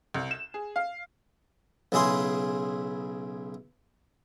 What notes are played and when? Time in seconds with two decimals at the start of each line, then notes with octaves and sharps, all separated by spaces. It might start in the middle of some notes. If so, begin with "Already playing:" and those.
0.14 C2
0.31 E7
0.54 G#4
0.76 F5
1.92 B1 C#3 E4 G#4 C6